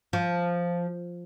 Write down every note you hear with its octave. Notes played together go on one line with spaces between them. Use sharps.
F3